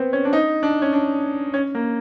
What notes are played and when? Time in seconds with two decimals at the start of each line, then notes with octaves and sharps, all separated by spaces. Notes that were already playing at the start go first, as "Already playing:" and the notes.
Already playing: B3 C4
0.13 C#4
0.25 D4
0.33 D#4
0.63 D4
0.82 C#4
0.93 D4
1.54 C#4
1.75 A#3